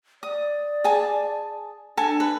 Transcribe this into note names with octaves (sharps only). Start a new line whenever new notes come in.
D5 D#6
G#4 G#5 A5
D4 A4 G#5
B4